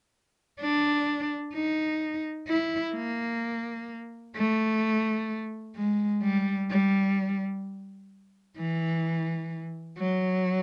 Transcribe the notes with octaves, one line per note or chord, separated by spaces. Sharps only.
D4
D#4
E4
A#3
A3
G#3
G3
G3
E3
F#3